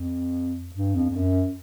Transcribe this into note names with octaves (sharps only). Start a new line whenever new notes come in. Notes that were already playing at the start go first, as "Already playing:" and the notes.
Already playing: F2
G2
F2
F2
F#2